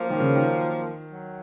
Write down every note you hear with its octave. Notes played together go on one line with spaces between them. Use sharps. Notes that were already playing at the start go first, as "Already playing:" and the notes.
Already playing: F#2 F3 A#3 F4
D#3
C#3
D#3
F#3